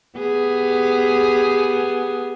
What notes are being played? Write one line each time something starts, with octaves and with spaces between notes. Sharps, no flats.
B3 G4 G#4